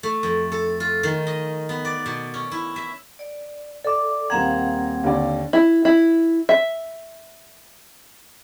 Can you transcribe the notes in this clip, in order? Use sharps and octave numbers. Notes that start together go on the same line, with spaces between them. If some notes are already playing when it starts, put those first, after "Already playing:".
A3
F2
A4
F4
D#3
D#5
B3
D5
B2
C#4
E4
E5
D5
A4 D5 E5 D6
D#1 A#3 C4 F5 F#5 A#5 G#6
D#2 D3 D5
E4
E4
E5